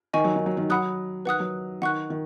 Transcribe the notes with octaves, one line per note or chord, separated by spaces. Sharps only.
D#3 D#5 G#5 C#6
F#3
D#3
F#3
D#3
F#3 F#5 B5 D#6 F#6
D#3 B4 F#5 D#6 F#6
F#3
D#3 F#5 C#6 F#6
D#3